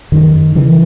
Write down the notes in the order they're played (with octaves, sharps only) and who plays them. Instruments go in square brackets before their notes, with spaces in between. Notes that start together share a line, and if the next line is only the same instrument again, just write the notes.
[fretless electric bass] F#2 D#3
C#3 E3